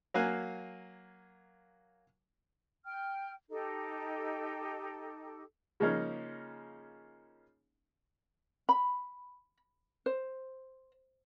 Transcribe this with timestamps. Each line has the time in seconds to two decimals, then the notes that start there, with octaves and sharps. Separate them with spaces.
0.14 F#3 A#3 F5 G#5 F#6
2.85 G5 F6
3.50 D#4 G4 A4
5.80 C#3 F3 G#3 A#3 C#4 D#4
8.69 B5
10.06 C5